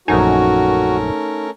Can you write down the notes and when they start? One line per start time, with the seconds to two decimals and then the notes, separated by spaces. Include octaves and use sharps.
0.08 A#1 F#2 A3 C#4 D#4 F#4 A#4 G#5